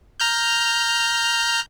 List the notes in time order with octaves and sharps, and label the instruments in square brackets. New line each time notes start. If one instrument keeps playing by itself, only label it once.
[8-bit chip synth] A#5 F6 G6